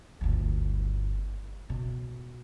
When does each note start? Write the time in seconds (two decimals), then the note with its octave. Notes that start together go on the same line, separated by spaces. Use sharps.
0.21 G1 D2
1.70 B2